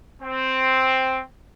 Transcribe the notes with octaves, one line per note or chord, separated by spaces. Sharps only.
C4